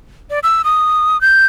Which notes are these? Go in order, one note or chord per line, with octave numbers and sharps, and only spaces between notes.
D5
E6
D#6
G6